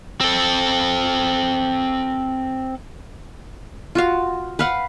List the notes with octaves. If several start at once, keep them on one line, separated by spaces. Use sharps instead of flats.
C4 A4
F4 F#4 F5
B4 F5 F#5